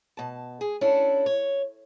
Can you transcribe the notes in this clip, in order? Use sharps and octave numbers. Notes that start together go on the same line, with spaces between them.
B2 A5
G#4
C#4 D4 E4 A4
C#5